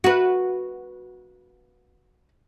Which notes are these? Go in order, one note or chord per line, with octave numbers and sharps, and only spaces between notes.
F#4 B4